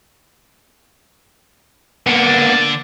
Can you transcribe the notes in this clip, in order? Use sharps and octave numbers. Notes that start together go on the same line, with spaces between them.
D3 A#3 B3 D4 C#7
A6